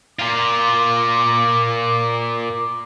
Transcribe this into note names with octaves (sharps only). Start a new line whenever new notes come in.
A#2 F4 D6